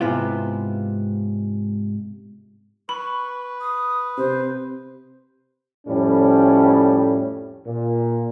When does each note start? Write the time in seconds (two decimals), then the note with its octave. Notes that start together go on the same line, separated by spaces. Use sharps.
0.01 G#2 C3 B3 E4 F4
2.89 B4 B5 C#6
3.61 D#6
4.17 C3 C5
5.87 F2 A2 G3 C#4
7.66 A#2